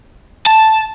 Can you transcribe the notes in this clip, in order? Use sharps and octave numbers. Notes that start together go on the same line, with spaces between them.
A5